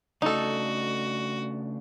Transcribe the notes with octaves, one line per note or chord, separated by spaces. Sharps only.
C#3 A3 D4 D#4 F#4 A4